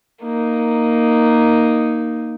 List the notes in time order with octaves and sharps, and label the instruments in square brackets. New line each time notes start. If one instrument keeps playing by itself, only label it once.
[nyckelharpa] A#3 D#4